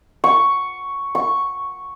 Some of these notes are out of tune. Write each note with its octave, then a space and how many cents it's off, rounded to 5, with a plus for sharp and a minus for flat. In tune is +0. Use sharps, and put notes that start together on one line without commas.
C#6 +5
C#6 +0